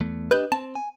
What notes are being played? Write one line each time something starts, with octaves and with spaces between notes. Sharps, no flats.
E2 A3
D4 G4 B4 D#5 F#6 G6
C4 A5
G#5